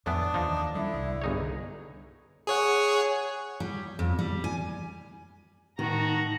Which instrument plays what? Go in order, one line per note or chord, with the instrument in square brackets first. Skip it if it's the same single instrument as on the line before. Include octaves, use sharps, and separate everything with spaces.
[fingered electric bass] F2 [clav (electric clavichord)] A2 E3 B3 [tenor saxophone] D4 [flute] D#6
[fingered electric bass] D#2 E3 [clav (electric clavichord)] F3 D#4
[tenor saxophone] D3 [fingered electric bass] G3 C#4 [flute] E4
[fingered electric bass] C2
[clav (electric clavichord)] G1 D#4 C#5 [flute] G#4
[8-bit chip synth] G#4 C#5 F#5
[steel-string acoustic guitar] G3
F2
G3
G#5
[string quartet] A2 D#4 A5 [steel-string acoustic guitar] D#3 [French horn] F#4 [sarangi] A#5